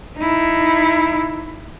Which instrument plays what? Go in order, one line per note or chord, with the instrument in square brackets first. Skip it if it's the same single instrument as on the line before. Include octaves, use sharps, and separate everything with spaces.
[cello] D#4 E4